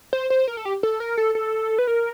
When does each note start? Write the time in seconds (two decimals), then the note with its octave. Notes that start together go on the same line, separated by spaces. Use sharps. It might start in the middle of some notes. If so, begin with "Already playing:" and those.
0.13 C5
0.30 C5
0.48 A#4
0.57 A4
0.65 G4
0.83 A4
1.00 A#4
1.17 A4
1.35 A4
1.79 B4
1.87 A#4